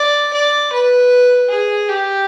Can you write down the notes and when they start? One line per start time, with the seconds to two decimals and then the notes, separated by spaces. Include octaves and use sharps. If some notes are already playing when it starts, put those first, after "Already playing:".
Already playing: D5
0.33 D5
0.72 B4
1.49 G#4
1.89 G4